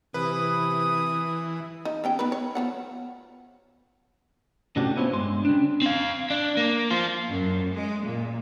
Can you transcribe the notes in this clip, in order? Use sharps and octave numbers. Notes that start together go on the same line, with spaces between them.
C3 E3 B4 D#6
D#4
B3 C#4 G5
B3 D#4 B4
C#5
F3 B3 F#5
A2 C3 C#4 D4 F#4 G4
B3 E4 F4 C5 C#5
G2 G#3 C6
C#3 G3 D4
C4 F5
D4
A#3
F4 C5
F#2
G#3
A#2